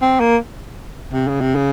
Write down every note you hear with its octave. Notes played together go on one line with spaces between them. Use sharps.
C4
A#3
C3
C#3
C3
C#3